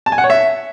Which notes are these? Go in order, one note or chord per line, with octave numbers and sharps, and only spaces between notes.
A5
G#5
F#5
C#5
E5